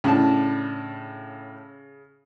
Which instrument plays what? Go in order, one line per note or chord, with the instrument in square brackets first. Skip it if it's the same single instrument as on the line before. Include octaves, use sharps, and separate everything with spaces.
[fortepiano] A2 D4 A5 [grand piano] C#3